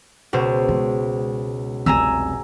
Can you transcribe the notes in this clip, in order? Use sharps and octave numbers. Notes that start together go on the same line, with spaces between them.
C#2 B2 C5
G#3
F1 C2 G#5 A#5 E6